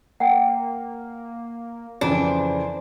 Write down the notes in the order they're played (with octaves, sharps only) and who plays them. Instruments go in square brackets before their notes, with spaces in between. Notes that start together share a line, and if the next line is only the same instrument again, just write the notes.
[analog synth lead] A#3 [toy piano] F#5 G5
[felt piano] F2 C#3 E3 [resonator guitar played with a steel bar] D4 [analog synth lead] C5